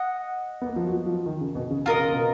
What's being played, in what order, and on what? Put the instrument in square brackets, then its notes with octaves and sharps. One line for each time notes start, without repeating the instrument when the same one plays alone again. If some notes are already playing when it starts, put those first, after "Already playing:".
Already playing: [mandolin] D#5 F#5
[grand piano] B3
A#3
F3
F#3
F3
D#3
C#3
B2
C#3
[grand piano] B2 [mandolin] F4 A#4 D#5
[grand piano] C#3
B2